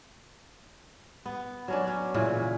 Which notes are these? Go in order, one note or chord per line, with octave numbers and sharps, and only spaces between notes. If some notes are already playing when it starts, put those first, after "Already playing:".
B3
F#3 C#4 D4
C#4
A#2 C#3 E3